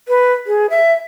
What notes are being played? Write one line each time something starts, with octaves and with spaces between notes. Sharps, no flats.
B4
G#4
E5